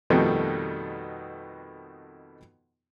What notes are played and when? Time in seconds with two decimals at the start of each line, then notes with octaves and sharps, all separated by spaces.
0.10 F2 B2 D#3 G3 A3 B3